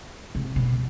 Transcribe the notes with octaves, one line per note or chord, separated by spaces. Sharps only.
C3
B2